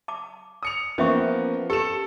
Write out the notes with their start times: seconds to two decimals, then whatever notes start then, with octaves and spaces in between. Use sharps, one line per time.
0.08 A5 D6
0.63 D#6 C#7 F7
0.98 F3 A#3 B3 C#4 E5 C#6
1.70 G4 A4 E7